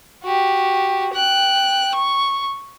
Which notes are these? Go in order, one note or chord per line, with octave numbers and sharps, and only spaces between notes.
F#4 G4
G5 F#6
C#6